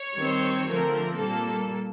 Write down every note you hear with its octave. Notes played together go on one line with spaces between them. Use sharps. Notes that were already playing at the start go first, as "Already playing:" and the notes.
Already playing: C#5
D#3 G3 C4
D3 F3 A3 C4 A#4
A#2 G3 A#3 A4